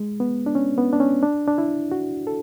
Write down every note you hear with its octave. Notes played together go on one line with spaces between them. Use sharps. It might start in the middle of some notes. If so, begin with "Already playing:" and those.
Already playing: G#3
B3
D4
C#4
B3
D4
C#4
D4
D4
E4
F#4
A4